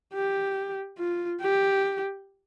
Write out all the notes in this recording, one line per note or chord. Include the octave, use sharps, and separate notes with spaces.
G4
F4
G4